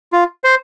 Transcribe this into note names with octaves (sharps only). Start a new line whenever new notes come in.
F4
C5